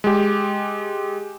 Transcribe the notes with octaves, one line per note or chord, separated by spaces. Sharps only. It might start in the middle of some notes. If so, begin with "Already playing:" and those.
G#3 G4